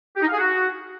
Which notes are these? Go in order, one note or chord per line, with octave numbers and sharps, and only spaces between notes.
G4
D#4
F5
G#4
F#4